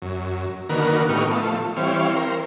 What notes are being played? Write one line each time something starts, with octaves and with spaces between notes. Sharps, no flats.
F#2
D3 D#3 A#3 F#4 A#4 B4
A2 B3 D#4 G4 C#6 F6
F3 A3
E3 G3 C4 C#5 F5
A#4 C5